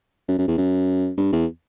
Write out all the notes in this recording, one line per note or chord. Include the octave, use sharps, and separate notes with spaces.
F#2
F#2
E2
F#2
G2
E2